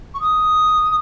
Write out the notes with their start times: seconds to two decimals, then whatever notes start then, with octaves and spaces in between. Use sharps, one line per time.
0.14 C#6
0.20 D#6